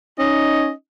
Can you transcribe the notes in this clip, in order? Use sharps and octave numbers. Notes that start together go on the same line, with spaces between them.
C#4 D#4 D#5